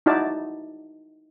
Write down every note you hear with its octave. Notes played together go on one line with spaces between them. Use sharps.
D#4 E4 F#4 D5 A5